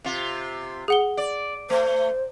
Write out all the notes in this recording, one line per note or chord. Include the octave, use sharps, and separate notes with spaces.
C3 F4
G#4 F#5 G7
D5
A3 C5